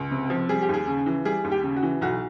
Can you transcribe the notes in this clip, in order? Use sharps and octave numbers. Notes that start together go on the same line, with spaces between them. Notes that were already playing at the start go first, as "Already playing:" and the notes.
Already playing: C#2
C3
F3
G3 G#4
G4
D#2 G#4
C#3
E3
G3 G#4
D#2
G4
C#3
F#4
E3
B1 F#4